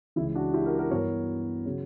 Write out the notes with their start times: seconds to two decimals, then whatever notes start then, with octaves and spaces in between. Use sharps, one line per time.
0.16 C#2 C#3 E3 E4
0.35 D4 F#4
0.53 E4 G4
0.66 F#4 A#4
0.78 F#4 A#4
0.91 G2 E3 B3 A#4 C#5
1.66 C#3 F#3